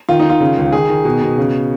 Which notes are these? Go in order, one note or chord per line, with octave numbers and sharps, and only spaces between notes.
D#3 F4
D#4
D#3
F4
C#3
C#2
D#3 G#4
D#3
B2
B2
C#3